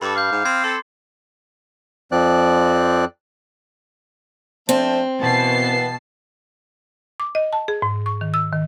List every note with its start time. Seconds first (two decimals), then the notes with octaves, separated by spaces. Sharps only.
0.02 G2 A4 B5 D6
0.15 F5 D6 G6
0.32 G#2
0.45 C4 G#6 C7
0.64 A4 C6
2.12 F2 F3 C4 D5 F#6
4.69 F3 A3 C4 D4
5.21 B2 E3 A#3 B3 A5 C7
7.20 D6
7.35 D#5
7.53 A5
7.68 G#4
7.82 G#2
8.06 C#6
8.21 D#3
8.34 E6
8.53 D#3